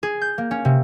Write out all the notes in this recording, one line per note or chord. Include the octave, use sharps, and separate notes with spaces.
G#4
G6
A#3
C#4
C3